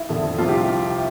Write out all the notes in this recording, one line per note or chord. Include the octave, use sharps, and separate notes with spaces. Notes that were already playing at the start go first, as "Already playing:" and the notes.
Already playing: E4
F2 D3 F3
C2 C3 F3 F4
G4